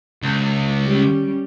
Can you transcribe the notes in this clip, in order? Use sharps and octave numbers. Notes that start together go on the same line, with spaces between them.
C#2
G3 C#4